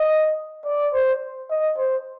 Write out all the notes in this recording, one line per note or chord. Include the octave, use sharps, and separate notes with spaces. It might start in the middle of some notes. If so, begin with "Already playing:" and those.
Already playing: D#5
D5
C5
D#5
C5